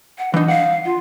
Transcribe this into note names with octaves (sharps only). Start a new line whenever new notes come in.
F#5
E3 D4 D#4
F5 F#5
F4